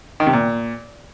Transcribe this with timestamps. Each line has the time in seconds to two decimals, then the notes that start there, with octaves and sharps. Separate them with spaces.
0.20 D#3
0.27 C3
0.33 A#2